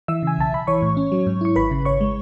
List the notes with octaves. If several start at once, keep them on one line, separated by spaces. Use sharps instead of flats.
E3 E5 E6
C#3 G#5
B1 A5
B1 B5
E3 C#5 C#6
A2
C#4
F#3
G#2
E4 C#6
G#1 B4 B5
C#3
G#1 C#5 C#6
G#3